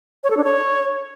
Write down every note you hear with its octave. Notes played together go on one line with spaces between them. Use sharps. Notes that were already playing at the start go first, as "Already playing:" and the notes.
C#5
A4
D4
C#5